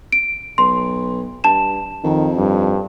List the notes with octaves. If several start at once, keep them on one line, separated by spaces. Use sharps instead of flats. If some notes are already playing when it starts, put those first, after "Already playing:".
D7
B1 C6
G2 A5 E7
F2 D#3
G2